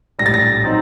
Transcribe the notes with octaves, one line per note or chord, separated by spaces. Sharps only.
A#1 A2 G3 A#6
A6
A#6
F#3 C4 D#4